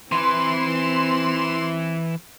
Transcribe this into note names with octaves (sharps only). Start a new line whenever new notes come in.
E3 C4 B4 C6